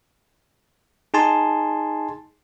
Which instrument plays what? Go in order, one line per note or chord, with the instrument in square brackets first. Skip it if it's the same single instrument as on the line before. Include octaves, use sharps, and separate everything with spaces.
[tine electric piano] D#4 G#4 G#5 A5 C6